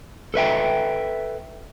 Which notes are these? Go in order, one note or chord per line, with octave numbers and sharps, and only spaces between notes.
A4 B4 E5 G5